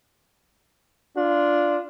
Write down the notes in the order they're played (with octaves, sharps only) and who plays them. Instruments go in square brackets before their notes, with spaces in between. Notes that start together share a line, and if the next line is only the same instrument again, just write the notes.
[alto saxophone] D4 [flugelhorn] F4